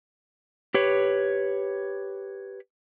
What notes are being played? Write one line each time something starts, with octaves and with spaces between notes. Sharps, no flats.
G4 B4 C#5